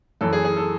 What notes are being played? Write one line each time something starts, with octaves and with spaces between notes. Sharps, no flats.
F#1 F#2 E3 A4
G#4
G#4
A4